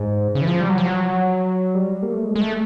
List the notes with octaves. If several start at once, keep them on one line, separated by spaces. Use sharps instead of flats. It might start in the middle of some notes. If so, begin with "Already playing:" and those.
Already playing: G#2
C#3
E3
F3
G3
F#3
F3
F#3
G3
A#3
A3
G#3
G#3
A3